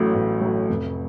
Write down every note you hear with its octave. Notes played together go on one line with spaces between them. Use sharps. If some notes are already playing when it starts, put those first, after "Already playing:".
Already playing: A1 A2 F#3
A1
A2 F#3
F1